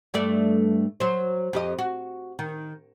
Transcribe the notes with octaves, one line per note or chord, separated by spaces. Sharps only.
G2 A3 D5
F#3 C5
F2 G4 D#5
F#4
D#3